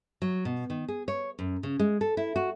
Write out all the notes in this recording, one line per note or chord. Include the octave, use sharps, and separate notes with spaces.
F#3
B2
D#3
G#4
C#5
F#2
C#3
G#3
A4
E4
F#4